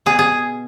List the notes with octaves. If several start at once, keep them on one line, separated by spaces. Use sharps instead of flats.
B2 G#4
G#4